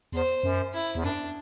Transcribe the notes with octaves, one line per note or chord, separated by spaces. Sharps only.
E2 C5
F#2
E4
E2
F#2 D4